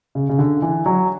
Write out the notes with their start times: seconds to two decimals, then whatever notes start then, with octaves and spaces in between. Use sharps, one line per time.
0.15 C#3
0.29 C#3
0.39 D3
0.62 E3
0.86 F#3